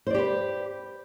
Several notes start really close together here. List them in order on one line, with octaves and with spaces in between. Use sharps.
C5 D5 G4 B4